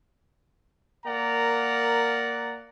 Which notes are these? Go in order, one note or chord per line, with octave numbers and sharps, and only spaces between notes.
A#3 A#4 D5 F#5 A#5